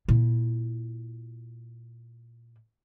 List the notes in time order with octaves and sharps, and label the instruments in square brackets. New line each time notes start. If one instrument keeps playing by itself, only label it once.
[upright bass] A#2 E4